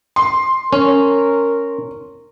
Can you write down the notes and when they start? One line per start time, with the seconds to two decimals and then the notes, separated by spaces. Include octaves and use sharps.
0.16 C6
0.73 C#4 A#4